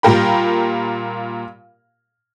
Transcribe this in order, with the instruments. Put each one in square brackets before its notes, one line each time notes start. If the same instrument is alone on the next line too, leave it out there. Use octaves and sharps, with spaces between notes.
[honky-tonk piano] A#2 G3 F4 A#4 G5 B5